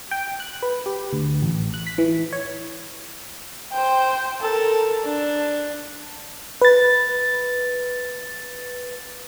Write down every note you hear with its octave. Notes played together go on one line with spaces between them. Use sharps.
G5
F#6
B4
G4
D2
A1
F#6
B6
E3
C#5
C5 G5
A4 A#4
D4
B4 A6